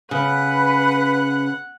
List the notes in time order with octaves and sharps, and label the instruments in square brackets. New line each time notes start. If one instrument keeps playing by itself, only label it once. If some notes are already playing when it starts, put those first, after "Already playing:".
[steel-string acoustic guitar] C#3 [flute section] B4 [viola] F#5